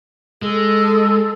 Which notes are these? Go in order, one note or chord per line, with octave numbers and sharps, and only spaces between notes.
G#3 A4